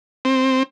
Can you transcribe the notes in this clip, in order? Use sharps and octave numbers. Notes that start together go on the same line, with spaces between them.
C4